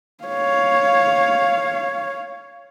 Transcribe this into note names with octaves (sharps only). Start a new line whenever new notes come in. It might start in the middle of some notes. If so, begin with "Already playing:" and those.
C#5 F5